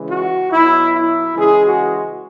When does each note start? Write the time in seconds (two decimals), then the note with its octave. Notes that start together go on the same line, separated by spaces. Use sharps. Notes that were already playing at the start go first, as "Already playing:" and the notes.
Already playing: C#3 E3 G#3
0.08 F#4
0.51 B2 F#3 E4
0.93 E4
1.35 C#3 E3 G#3 G#4
1.64 F#4